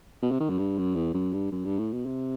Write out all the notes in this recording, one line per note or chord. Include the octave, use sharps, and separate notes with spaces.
B2
C3
D#3
F#2
G2
F#2
E2
F#2
G2
F#2
G2
A2
B2
C3